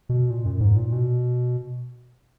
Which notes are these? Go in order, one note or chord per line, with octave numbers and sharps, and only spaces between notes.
B2
A#2
F#2
G#2
A#2
B2